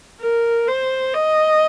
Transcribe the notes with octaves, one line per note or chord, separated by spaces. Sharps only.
A#4
C5
D#5